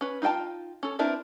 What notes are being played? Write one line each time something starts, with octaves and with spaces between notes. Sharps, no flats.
C#4 B4
D#4 F4 D5 G5 A5
C#4 A4
C4 D4 E4 A#4 B4